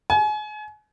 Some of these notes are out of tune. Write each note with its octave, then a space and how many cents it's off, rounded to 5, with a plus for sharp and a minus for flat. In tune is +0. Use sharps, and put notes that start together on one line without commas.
G#5 +35